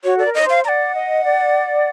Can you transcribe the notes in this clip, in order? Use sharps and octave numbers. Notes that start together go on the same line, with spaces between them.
F#4 C#5
A4 D5
A#4
C#5 D#5
C5
F5
D5 F#5 A#5
D#5
D5